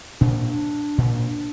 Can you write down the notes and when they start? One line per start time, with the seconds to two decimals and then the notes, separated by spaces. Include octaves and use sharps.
0.21 A#2 D4
0.98 A#2